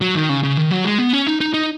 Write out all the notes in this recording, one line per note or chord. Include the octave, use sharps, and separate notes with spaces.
F#3
D#3
C#3
C#3
D#3
F#3
G#3
B3
C#4
D#4
D#4
D#4